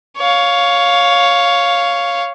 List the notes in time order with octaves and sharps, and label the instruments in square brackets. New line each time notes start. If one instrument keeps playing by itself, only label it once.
[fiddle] C#5 F5